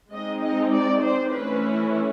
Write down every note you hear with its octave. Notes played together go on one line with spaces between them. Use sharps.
G#3 C4 D#4 D#5
D#5
D5
C5
E3 A3 C#4 E4 B4